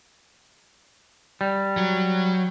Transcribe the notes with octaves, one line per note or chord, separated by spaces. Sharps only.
G3
F#3